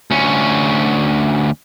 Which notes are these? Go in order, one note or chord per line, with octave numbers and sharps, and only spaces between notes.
D2 C#4